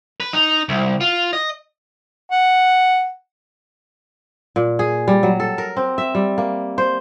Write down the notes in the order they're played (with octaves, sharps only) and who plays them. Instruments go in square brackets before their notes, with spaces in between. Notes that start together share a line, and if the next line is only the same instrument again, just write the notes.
[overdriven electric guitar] B4
D#4
C2
F4
D#5
[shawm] F#5
[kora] A#2
G#4
G3
F#3
A4
A#4
C4
E5
G3
A#3
C5